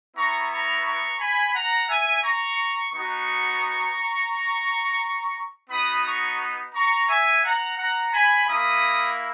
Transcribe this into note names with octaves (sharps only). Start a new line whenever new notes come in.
B3 E4 A#5 C#6
A#5 C#6
A#5 C#6
G#5 B5
F#5 A#5
E5 G#5
A#5 C#6
B3 D#4 F#4 A#5 C#6
B3 D#4 F#4 B5 D#6
A#5 C#6
A#5 C#6
E5 G#5
F#5 A#5
F#5 A#5
G#5 B5
A#3 E4 B5 D#6